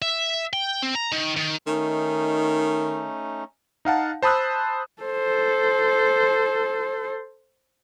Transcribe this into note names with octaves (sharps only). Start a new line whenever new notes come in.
E5
G5
C4
A#5
D#3
D#3
D#3 A3 C#4 D#4
D#4 F5 F#5 A5
C5 A5 B5 D#6 E6 F#6
A4 C5